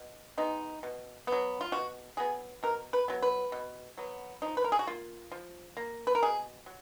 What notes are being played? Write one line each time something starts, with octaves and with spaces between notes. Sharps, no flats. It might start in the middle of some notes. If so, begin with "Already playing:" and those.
Already playing: B2
G#3 B3 D#4
B2
B3
F#3
F4
B2 F#4
F#3 B3 G#4
B2 A#4
B4
F#3 B3
B4
B2
F#3 B3
F3 D#4
B4
A#4
G#4
F#4
A#3 F4
F3
A#3
B4
A#4
B2 G#4
F#3